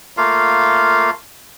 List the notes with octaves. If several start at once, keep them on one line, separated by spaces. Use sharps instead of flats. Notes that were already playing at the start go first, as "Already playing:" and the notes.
A3 A#3 F4 F5